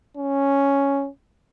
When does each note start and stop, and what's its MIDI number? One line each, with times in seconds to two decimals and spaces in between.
0.17 1.09 61